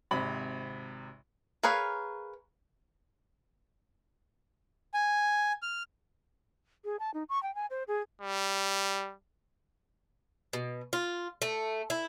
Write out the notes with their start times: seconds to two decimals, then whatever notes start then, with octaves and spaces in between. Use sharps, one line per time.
0.11 G#1 C3 B5 F#7
1.63 G#4 A#4 B4 C#5 F5
4.94 G#5
5.62 F6
6.84 G#4
7.00 A5
7.14 D#4
7.29 C#6
7.43 G5
7.55 G#5
7.70 C5
7.88 G#4
8.21 G3
10.53 B2
10.93 F4
11.42 A3
11.90 E4